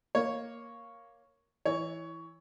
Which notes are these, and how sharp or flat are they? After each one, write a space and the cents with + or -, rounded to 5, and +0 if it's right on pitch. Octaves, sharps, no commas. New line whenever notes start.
A#3 +0 C#5 +0
E3 +0 C#5 +15